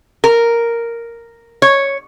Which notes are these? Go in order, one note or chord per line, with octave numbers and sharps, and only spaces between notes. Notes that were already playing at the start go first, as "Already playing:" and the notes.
A#4
C#5